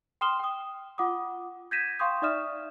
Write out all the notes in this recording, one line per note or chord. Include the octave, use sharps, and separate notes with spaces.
G5 C6 D#6 F6 E7 G7
G5 D#6
F4 F#5 D6 D#6
G6 G#6 A#6 B6 D#7 E7
F5 G5 C6 C#6 D#6 G6
D#4 D5 E5 D#6 F6 E7